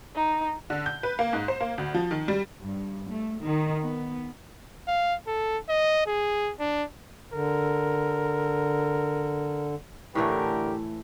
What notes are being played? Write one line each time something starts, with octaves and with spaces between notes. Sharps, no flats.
D#4
D3
G6
B4
A#3
G#2
C5
A#3
D2
F3
D#3
G3
G2
A3
D#3
B3
F5
A4
D#5
G#4
D4
D3 A#4
A2 D3 E3 A3 G4 A#4